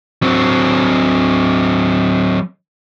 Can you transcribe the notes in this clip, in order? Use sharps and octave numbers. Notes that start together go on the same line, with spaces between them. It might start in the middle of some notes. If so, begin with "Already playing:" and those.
F#3 C4